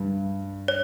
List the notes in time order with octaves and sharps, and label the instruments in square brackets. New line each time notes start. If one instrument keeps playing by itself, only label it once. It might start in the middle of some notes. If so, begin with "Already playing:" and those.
Already playing: [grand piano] G2
[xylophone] C#5